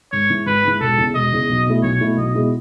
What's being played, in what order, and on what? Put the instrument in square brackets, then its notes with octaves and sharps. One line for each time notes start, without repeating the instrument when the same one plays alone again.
[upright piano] G#1 [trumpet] C#5
[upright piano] G#2 E3
[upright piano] G#1 [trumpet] B4
[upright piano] G#2 E3
[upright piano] E1 [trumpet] A4
[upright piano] E2 C#3
[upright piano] E1 [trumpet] D#5
[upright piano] E2 C#3
B1
B2 A3 E4
[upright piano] B1 [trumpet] C#5
[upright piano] B2 A3 E4
[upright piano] B1 [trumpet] D#5
[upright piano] B2 G#3 B3 E4